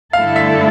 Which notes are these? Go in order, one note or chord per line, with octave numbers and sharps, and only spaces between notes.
G2 D3 A3 E4 A4 F5
E5